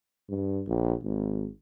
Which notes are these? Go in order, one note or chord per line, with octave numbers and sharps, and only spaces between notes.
G2
A#1
G#1